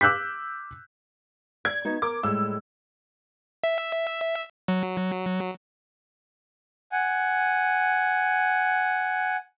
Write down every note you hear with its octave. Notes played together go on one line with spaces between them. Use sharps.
D6 E6 F#6 G6 B6
D5 G#6
B3 D#4 F#4
A#4 D6
A2 G3 G#3 E6
E5
F#3
F#5 G#5